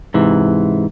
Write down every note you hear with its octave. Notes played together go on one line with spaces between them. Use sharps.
G#2 C3 E3